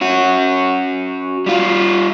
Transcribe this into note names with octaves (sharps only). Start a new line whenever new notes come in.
C#4 F#4
G3 F4